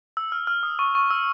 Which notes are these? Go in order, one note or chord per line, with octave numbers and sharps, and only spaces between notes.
E6
F6
F6
D#6
C#6
C#6
E6